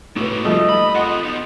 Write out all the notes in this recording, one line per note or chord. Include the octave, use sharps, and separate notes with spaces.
A2 A#3 F#4 B4
F3 G3 A3 D#5
B5
F4 A4 F#5
B3 D#4